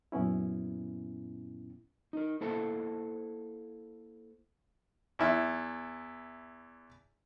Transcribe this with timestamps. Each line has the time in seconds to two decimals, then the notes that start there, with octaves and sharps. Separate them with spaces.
0.12 F#2 A#2 B3 C#4 E4
2.13 D#4 A#4
2.41 A#3 E4 A4 C5 F#5 A5
5.19 E2 E4